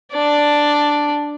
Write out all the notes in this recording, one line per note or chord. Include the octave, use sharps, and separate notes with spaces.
D4 D5